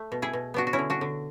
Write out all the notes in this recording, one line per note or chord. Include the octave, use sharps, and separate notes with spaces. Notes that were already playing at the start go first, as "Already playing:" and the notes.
Already playing: A3
B2
E4 G#4
B2
B3 D4 F#4
F#4
C#4 E4
D3
D4 F#4
D3